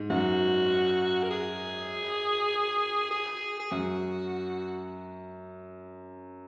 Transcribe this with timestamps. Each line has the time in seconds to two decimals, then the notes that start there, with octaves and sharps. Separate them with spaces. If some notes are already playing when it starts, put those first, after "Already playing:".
Already playing: G#2
0.10 F#2 F#4
1.23 A#4
1.30 G#4
3.11 G#4
3.60 G#4
3.71 F#2 F#4